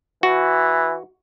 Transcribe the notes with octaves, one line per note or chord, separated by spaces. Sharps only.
E3 F#4